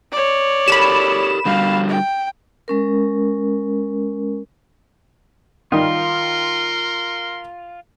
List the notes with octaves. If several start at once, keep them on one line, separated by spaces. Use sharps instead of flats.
C#5 D5
G4 A4 A#4 B5 E7
D3 G3 F#4 F5
G5
G#3 C#4 A#4
D#3 G3 D#4 F4 A#4 C6